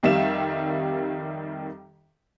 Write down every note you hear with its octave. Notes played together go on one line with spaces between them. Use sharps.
F2 D#3 G3 E5 F5 E7